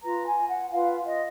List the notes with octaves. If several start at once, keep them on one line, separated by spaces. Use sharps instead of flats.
F4 B4 A#5
G#5
F#5
F4 B4 F5
D#5